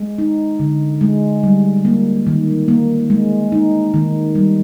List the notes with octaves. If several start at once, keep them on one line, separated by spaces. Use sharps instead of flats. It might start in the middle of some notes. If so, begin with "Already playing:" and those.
Already playing: G#3
D#4
D3
G#3
G3
A#3
D#3
A#3
G#3
D#4
D#3
G3